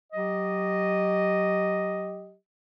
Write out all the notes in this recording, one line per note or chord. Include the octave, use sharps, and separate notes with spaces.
F#3 G4 D#5